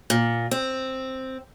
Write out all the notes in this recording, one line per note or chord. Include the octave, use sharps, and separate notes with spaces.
A#2
C4